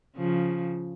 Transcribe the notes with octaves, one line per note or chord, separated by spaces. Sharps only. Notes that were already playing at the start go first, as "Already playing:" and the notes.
C#3 F3